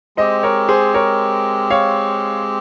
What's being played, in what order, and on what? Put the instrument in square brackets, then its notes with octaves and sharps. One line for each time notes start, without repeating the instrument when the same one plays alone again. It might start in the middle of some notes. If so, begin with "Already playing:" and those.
[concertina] G#3 C4 G4 [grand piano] C5 D#5
[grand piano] A#4 C#5
G#4 C5
A#4 C#5
C#5 F5